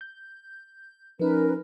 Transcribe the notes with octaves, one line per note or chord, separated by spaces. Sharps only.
G6
F3 C#4 D#4 A#4 B4